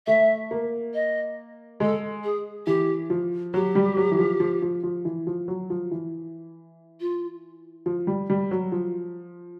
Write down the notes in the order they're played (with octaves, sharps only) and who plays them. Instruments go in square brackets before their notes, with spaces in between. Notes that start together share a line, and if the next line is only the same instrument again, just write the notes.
[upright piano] A3 [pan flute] E5
[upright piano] A#3
[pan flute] D#5
[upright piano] G#3 [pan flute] A4
[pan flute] G#4
[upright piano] E3 [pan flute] G4
[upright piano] F3
[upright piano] F#3 [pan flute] G4
[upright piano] G3
F#3
E3
F3
F3
F3
F3
E3
F3
F#3
F3
E3
[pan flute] F4
[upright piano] F3
G3
G3
F#3
F3